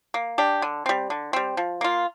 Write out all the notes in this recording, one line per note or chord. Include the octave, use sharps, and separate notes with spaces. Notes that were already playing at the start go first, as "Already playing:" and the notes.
A#3
D4 G4
D3
G3 C4
D3
G3 C4
F3
A#3 F4